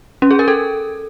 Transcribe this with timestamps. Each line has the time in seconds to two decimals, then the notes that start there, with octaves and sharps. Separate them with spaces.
0.22 C#4
0.31 G#4
0.39 A#4
0.48 A4